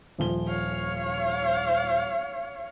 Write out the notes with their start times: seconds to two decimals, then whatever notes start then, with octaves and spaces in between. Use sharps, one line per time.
0.19 D#1 F3 G7
0.48 C#5 F5